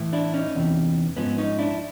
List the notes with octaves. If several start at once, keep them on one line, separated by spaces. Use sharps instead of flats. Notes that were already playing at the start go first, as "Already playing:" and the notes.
Already playing: A2 E3
D4 E4
C#4 D#4
E2 C3 E3
G#2 F3 B3 C#4
C#4 D#4
D4 E4